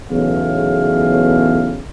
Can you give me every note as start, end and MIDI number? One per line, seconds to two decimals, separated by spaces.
0.10 1.80 35
0.10 1.80 40
0.10 1.80 45
0.10 1.80 49
0.10 1.80 77